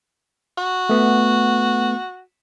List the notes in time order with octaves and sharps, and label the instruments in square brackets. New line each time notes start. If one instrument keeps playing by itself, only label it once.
[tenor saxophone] F#4
[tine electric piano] A3 B3